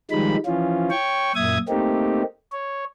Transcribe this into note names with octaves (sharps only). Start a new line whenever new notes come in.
D#3 F3 G3 G#3 D#4 B5
E3 F3 C#4 F4
C#5 G5 C#6
F#2 A#2 E5 D#6 G#6
A3 A#3 C4 D#4 G4
C#5